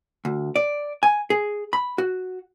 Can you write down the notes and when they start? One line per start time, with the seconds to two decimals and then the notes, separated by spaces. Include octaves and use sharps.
0.25 D2
0.56 D5
1.03 G#5
1.30 G#4
1.73 B5
1.98 F#4